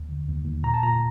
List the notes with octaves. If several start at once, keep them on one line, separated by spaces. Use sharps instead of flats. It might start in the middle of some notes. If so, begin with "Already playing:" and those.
Already playing: D#2
D3
D#2
D#2
A#2 A#5
A5
A#2 A#5